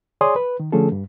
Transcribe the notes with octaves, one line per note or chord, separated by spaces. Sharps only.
G#4 C#5 D5 G#5 C6 D#6
B4
D#3
D3 F3 A3 C#4 G#4 A4
G2